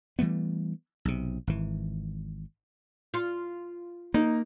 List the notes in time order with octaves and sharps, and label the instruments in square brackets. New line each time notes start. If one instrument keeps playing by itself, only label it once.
[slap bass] E3 G3 A3 B3
B1 C3
G#1 E3
[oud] F4
[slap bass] A#3 [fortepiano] D#4